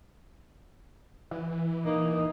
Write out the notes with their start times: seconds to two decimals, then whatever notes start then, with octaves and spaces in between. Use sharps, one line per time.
1.31 E3
1.85 A#3 D#4